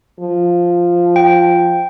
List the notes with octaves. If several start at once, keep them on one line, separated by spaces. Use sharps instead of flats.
F3
G5